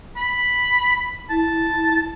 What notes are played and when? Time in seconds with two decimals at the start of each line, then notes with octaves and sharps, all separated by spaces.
0.17 B5
1.30 E4 A5